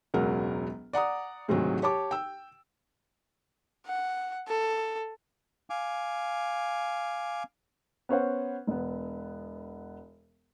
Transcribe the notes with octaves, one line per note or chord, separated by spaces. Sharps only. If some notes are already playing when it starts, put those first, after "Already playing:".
E1 C#2 F#3 A#4 F#5
D5 F#5 A#5 D#6
D2 G#2 C3 D#3 F#3 G#3
G4 C#5 A5 D6
G5 E6
F#5
A4
F5 G#5 D6
B3 C#4 C5 F#5
E1 B3